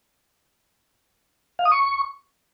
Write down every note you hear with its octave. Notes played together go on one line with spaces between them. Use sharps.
F5
D#6
C#6